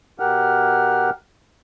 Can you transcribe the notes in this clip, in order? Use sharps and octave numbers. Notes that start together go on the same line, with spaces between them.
B2 G4 A#4 F#5 F6